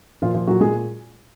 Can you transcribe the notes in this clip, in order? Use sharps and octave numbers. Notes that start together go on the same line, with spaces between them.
A#2 F3 F4
F3 F4
A#2 F#3 F#4
G#3 G#4